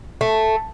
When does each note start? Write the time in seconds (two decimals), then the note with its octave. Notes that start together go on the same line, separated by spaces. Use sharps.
0.21 A3